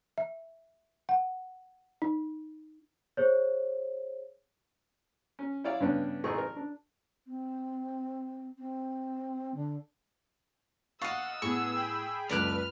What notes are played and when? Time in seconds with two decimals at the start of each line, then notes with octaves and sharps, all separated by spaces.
0.18 E5
1.09 F#5
2.02 D#4
3.17 G#4 C5 C#5
5.39 C#4
5.64 E4 C#5 D5 F5
5.80 G2 C#3 B3 D4 C#5
6.24 A1 A3 D#4 G#4 C#6
6.38 A#4
6.56 D4
7.27 C4
8.58 C4
9.54 D3
11.02 D#5 F5 F#5 C#6 E6 A6 C7
11.42 A2 B3 G#4 C#6
11.76 G#4 G5 B5
12.29 F#1 C#2 A3 B4 D5 F6 F#6